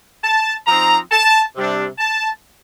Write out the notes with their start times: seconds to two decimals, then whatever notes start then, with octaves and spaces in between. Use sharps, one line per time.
0.23 A5
0.67 F3 C4 D#4 A#5
1.11 A5
1.56 C3 G3 D4
1.98 A5